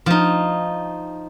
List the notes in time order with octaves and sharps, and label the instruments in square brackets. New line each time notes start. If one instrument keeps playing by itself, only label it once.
[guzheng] F3 D#4